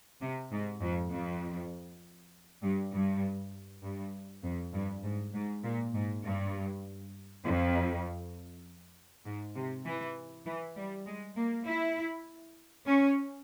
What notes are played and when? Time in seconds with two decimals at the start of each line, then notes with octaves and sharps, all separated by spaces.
0.21 C3
0.52 G#2
0.81 F2
1.11 F2
2.62 G2
2.92 G2
3.82 G2
4.43 F2
4.73 G2
5.03 G#2
5.34 G#2
5.64 A#2
5.94 G#2
6.24 G2
7.44 F2
9.26 G#2
9.55 C3
9.86 E3
10.46 E3
10.76 G3
11.06 G#3
11.36 A#3
11.65 E4
12.87 C#4